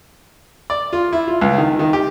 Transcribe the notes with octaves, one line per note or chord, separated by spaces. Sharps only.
D5
F4
E4
F4
C#2
D#3
D#3
G4